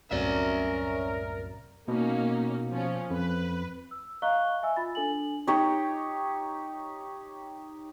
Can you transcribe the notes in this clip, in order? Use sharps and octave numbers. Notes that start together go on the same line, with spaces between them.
C2 F#2 A2 C#4 A#4 D5 E5
B2 A#3 C#4 D#4
F3 C#4
F2 B4
E6
D#5 F5 A#5 C#6 F#6 G7
E5 G#5 E6
F4 B5 A6
D4 A4 G#5 F#7
D#4 G4 C#5